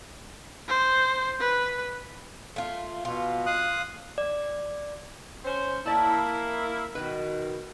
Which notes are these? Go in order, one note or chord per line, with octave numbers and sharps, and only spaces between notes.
C5
B4
A3 F4
B2 F4
F5 D#6 F#6
D5
C#4 C5
A#3 E4 D5 A5
B2 D#3 B4